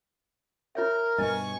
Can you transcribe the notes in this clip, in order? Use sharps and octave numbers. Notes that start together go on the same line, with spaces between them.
F4 A#4 C#5 E5
G2 B2 D#5 G#5 C#6